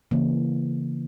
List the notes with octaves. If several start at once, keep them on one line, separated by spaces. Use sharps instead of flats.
C#3 E3 A#3